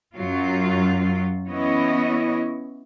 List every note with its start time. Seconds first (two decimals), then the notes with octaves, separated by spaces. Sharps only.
0.14 F#2 F#3 F4
1.47 E3 B3 C#4 E4 C#5 D#5